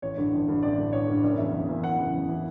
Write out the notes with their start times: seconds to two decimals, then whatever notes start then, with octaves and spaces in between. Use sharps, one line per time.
0.02 A1 C#5
0.17 G2 D3
0.33 A1
0.48 G2 D3
0.63 A1 D5
0.78 G2 D3
0.92 A1 C#5
1.08 G2 D3
1.23 F#1 D5
1.38 E2 C#3 E3 E5
1.54 F#1
1.68 E2 C#3 E3
1.83 F#1 F#5
1.99 E2 C#3 E3
2.14 F#1
2.29 C#3 E3